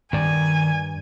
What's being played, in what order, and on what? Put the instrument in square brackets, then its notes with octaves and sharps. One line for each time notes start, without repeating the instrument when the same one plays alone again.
[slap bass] G2 [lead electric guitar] D#3 D5 [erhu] G#5